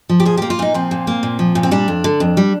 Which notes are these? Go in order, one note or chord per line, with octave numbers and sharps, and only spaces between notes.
F3
G4
A#2 G#4
A#3 G4
F4
A#2 D#4
F3 C4
A#2
A#3
A#2
F3
A#2
C4
G3 D4
F2
D3
F2
G3